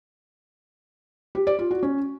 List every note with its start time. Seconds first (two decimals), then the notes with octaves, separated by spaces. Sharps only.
1.35 G4
1.47 D5
1.59 F4
1.71 F#4
1.83 C#4